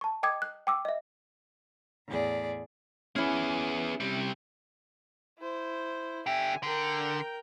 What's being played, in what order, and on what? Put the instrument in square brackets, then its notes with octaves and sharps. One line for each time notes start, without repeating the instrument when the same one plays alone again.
[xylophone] A5 C#6
D#5 G5 D6 D#6 G#6
F#6
G5 D6 E6
D#5 E5
[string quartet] E2 A2 G#4 D5
[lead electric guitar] B3 G#4 [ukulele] C#4 E4
[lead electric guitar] C3 G3
[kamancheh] E4 C5
[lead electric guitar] D3 G4 [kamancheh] E5 G#5
[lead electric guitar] D3 [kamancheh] A#4 G5